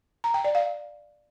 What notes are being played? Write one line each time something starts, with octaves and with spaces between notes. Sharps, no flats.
A#5
G5
D5
F5